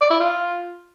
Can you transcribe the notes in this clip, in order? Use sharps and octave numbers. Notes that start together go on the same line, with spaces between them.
D5
E4
F4